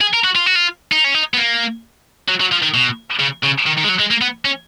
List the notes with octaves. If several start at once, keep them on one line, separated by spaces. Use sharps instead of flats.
G#4
A#4
F#4
F4
F#4
F4
D#4
C#4
D#4
B3
A#3
F#3
F#3
F3
D#3
B2
C#3
C#3
D#3
D#3
G#3
F#3
G#3
A#3
B3
C#4